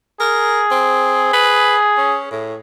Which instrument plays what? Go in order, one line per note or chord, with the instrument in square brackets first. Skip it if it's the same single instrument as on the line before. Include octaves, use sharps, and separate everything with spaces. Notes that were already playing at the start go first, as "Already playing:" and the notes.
[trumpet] G#4 [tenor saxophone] A#4
[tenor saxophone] C4
B4
C#4
A2